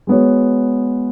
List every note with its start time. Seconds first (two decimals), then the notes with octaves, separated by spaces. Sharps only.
0.07 G#3 B3 F#4 C#5